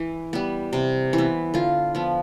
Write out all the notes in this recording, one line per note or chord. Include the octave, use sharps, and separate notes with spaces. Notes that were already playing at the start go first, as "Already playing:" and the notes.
Already playing: E3
G3 B3
C3
E3
B3
D3 F4
F3 B3